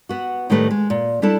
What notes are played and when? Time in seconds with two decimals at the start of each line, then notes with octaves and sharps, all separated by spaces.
0.09 B3 F#4
0.50 A2 D#3 G3 A3 B4
0.71 G#3
0.90 A#2
1.22 G3 D4 E4 A4 A5